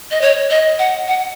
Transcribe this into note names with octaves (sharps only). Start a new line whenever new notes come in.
D#5
C#5
D#5
F#5
F#5